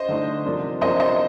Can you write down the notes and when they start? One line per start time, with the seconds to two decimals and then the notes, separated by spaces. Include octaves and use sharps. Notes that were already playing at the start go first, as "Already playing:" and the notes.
Already playing: C5 D#5
0.09 D3 A3 D#4
0.45 C3 F3 A#3 D4
0.81 C3 F3 A#3 D4 C5 D#5
1.00 C5 D#5